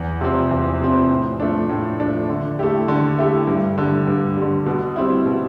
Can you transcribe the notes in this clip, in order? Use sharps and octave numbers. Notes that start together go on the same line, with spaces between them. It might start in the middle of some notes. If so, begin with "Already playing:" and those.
Already playing: E2
C3 F3 C4
E2
C3 F3 C4
A2
F3 A3 D4
A2
F3 A3 D4
D3
A3 E4 G4
D3
A3 E4 G4
G2
D3 G3
G2
D3 G3
B2
G3 C4 E4
B2